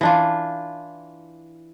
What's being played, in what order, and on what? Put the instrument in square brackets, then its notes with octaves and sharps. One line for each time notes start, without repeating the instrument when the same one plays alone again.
[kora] E3 D4 F4